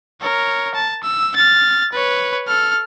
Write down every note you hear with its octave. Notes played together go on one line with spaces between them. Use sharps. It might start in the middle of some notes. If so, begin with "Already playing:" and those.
A#4 C#5
A5
E6
F6 A6
B4 C#5
A4 F6